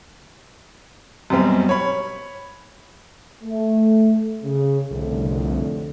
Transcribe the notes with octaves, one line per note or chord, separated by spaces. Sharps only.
F#2 B2 G3 C4
C#5 B5
A3
C#3
C2 F2 A2 D3